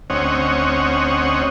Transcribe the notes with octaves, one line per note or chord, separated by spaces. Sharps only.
D2 C4 C#4 C#5 D#5 F#5